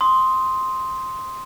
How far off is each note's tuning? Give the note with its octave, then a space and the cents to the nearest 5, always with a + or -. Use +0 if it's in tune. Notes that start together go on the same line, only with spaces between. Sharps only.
C6 +0 D#6 +10